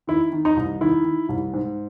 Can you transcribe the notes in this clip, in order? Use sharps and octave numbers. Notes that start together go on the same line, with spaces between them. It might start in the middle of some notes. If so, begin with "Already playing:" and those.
D#3 E4
D#3
D#4
C2
D#3 E4
D#3
C2
G#2